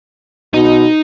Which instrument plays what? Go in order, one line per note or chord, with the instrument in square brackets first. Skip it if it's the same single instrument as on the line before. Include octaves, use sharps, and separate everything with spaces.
[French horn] B2 [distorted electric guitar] D#4